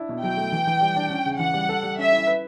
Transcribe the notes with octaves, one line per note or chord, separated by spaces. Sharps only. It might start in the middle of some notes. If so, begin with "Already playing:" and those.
Already playing: D4 E4
B2
F#3 G5
A3
E3
E3
G3
D4
C#4
C#3
E3 F#5
G3
A4
G3
C#4 E5
E4
B4